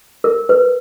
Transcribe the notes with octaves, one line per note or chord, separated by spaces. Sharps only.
A#4
B4